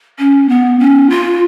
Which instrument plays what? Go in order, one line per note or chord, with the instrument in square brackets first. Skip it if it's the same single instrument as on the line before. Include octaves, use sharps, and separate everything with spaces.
[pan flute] C#4
B3
C#4
F4